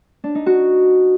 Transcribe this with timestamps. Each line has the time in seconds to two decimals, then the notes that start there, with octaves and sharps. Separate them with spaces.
0.24 D4
0.35 D#4
0.46 F#4